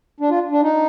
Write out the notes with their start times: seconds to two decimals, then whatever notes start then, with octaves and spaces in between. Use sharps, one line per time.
0.20 D4
0.30 F4
0.52 D4
0.62 D#4